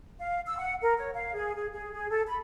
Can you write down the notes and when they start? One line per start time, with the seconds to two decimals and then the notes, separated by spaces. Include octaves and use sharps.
0.19 F5
0.47 E6
0.59 F#5
0.82 A#4
0.98 C#5
1.14 F5
1.34 G#4
1.55 G#4
1.73 G#4
1.93 G#4
2.10 A4
2.28 B5